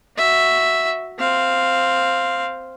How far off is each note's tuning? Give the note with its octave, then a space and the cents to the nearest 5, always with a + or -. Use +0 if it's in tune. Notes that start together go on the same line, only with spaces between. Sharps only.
F#4 +0 E5 +0
C4 +0 F5 +0